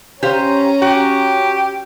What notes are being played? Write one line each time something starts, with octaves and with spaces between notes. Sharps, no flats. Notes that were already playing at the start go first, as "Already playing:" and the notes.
C#4 G4 C5 F5 A#5
F#4 G4